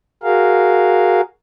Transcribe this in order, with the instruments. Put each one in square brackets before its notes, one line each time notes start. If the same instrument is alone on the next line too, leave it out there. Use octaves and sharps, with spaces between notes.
[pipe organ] F#4 G#4 A#4 F5